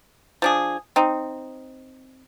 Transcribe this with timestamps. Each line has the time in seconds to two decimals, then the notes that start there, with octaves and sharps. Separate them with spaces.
0.42 F3 D4 G#4
0.96 C4 D#4